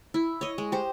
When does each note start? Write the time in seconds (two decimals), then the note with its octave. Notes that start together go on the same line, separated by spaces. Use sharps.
0.14 E4
0.41 C#5 D#5
0.58 G#3
0.72 G4 C5